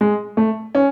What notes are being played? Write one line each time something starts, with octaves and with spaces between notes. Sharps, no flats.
G#3
A3
C#4